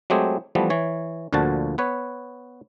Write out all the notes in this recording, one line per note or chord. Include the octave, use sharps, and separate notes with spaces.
F#3 G#3 A3 C4 G4 G#4
E3 F3 G3 A3 B3
E3 C#5
D2 A#2 D3 F3 F#4 A5
B3 B4 C#5